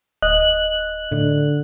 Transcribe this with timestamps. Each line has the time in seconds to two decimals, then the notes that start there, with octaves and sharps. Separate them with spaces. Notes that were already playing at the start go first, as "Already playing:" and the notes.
0.22 D1 D#5 F#6
1.12 A2 D3